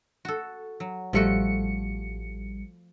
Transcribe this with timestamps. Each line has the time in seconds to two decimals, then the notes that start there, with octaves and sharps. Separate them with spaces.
0.25 F#4 A4
0.80 F#3
1.13 A1 F3 G3 A3 F#4 C#7